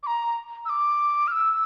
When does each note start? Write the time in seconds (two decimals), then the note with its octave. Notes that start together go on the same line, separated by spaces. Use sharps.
0.03 D6
0.07 A#5
0.65 E6
0.69 D6
1.28 F6
1.32 E6